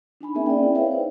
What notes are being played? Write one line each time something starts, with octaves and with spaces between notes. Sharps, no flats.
D4 D#4 G#5 B5
A#3 C4 C#4 G#4 A#4 E5
D5 G5
C4 E4
G#4 B4 C#5 E5 F5 G5
D#4 C5